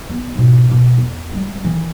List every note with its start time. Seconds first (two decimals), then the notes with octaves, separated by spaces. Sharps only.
0.09 B3
0.35 G#2 B2
0.71 B2
0.98 E2
1.33 G3 G#3
1.64 D#3 E3